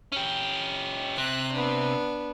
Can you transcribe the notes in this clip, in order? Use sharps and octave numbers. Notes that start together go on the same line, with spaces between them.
C#4 G4
C3 F#6
B3 D4